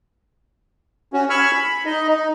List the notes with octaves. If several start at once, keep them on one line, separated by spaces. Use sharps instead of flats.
C#4 F#4
G#5 B5 C#6 E6 F6
B5
D#4 D#5
D#4